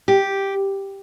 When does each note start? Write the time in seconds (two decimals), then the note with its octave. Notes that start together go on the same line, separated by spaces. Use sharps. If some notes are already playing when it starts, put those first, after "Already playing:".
0.08 G4